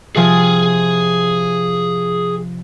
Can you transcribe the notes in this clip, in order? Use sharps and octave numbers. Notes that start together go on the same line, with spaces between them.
C3 F3 G#4 G#5 A6